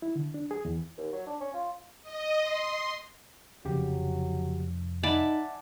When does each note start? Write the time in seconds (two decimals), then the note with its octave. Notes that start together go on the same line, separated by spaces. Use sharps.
0.02 E4
0.16 D3
0.34 D4
0.51 G#4
0.65 E2
0.98 D#2
1.13 F#3
1.27 D4
1.41 C#4
1.54 F4
2.02 D#5
2.41 C6
3.65 F1 F2 C#3 F#3 G4
5.03 D#4 D5 E5 F#5 G#5 A5 B5